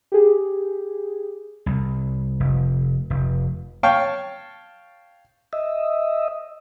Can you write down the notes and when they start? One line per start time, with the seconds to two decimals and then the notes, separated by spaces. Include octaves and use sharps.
0.12 G4 G#4
1.66 C2
2.40 F1
3.10 F1
3.83 C#5 F5 G5 A5 C#6
5.53 D#5 E5